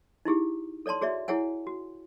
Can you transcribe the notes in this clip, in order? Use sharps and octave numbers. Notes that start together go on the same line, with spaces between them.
D#4 E4 G4 G#4
A4 C#5 D5 A5 C6
F#4 G#4 C#5 D5 E5
E4 G#4 C#5 F#5 G#5
F#4